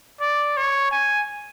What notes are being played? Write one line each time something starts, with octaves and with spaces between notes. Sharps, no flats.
D5
C#5
G#5